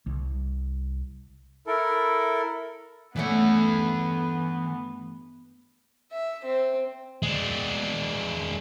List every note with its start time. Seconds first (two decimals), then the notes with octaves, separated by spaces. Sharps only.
0.06 C2
1.67 E4 A4 A#4
3.16 G2 E3 A3 B3 C#4 F#5
6.12 E5
6.45 C4
7.22 G#3 D4